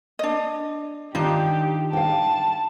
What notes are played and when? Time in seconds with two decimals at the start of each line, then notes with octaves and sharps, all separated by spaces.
0.19 D4 D#5
1.15 D#3 D4 D#4 F4 G4
1.93 F5 G5 A5